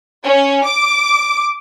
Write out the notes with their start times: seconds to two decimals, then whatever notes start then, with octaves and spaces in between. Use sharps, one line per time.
0.24 C#4
0.66 D6